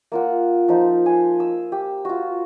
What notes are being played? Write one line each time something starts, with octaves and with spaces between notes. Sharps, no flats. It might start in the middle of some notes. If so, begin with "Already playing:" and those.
A#3 F4 F#5
F3 D#4 C5
G#5 C6
E6
G4
F4 F#4